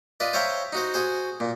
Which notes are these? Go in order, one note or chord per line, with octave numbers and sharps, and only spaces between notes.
F4 B4 D5 D#5
C5 C#5 E5 F5 G5 A#5
D#4 F#4 C5
F#4 G#4 C5
A#2